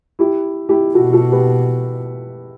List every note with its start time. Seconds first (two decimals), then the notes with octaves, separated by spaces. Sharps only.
0.19 E4 G4
0.69 E4 G4
0.94 B2 F#4 A4
1.13 F#4 A4
1.32 G4 B4